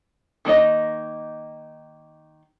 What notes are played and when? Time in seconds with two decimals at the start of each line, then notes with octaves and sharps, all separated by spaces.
0.45 D#3 A#3 D#4 D#5